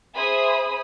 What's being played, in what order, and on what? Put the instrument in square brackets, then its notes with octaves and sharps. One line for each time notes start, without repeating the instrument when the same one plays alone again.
[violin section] G#4 C5 E5 B5 D#6